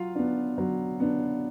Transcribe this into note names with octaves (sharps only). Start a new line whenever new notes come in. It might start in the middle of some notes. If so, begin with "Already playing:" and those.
Already playing: F#3 F4 F5
B3 D4
F#3
B3 D4